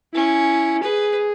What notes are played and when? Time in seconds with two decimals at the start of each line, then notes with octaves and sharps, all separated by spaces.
0.14 C#4 E4
0.83 G#4 B4